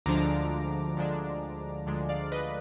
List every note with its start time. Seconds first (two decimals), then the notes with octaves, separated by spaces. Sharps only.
0.06 D2 D3 F3 G#3 D4 A#5 D6
0.96 D2 D3 F3 G#3 D4
1.87 D2 D3 F3 G#3 D4
2.09 D5 F5
2.32 B4 D#5